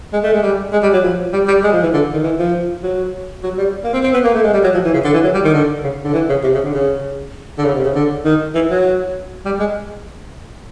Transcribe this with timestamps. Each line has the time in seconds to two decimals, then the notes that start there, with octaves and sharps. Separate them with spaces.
0.13 G#3
0.23 A3
0.33 G#3
0.42 G3
0.72 G#3
0.83 G3
0.93 F#3
1.03 F3
1.33 G3
1.48 G3
1.64 G#3
1.73 F3
1.83 E3
1.93 D3
2.13 D#3
2.23 E3
2.39 F3
2.83 F#3
3.43 F#3
3.58 G3
3.84 A#3
3.93 C4
4.03 C4
4.14 B3
4.24 A#3
4.34 A3
4.44 G#3
4.53 G3
4.64 F#3
4.74 F3
4.84 E3
4.93 C#3
5.04 D3
5.13 E3
5.24 F#3
5.34 G3
5.44 D#3
5.54 D3
5.83 C#3
6.04 D3
6.14 E3
6.29 C#3
6.43 C3
6.54 C#3
6.64 D3
6.74 C#3
7.58 D3
7.65 C#3
7.74 C3
7.84 C#3
7.95 D3
8.24 D#3
8.55 E3
8.70 F#3
9.45 G3
9.59 G#3